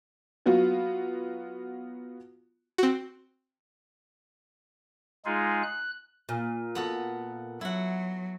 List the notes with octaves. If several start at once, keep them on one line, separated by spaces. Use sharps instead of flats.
F#3 B3 F4 F#4
C4 F#4
G#3 D#4 F4 G#4
F#6
A#2
B3 F#4 A4
F#3 E4 F#5